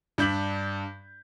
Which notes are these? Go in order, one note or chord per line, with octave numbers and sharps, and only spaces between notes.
G2 D4 G6 B6 F#7